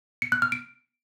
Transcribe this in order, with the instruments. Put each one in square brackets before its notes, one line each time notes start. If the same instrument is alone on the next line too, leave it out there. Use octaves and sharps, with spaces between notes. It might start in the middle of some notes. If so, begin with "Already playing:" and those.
[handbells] C#7
F#6
F6
D7